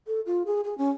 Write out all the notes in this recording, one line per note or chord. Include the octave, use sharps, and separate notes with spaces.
A4
F4
G#4
G#4
C#4